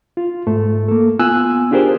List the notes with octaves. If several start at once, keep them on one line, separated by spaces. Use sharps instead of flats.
F4
G#2 A3
A#3 A4
B3 F4 G#5 E6 F#6
D4 F4 G4 G#4 A#4 C5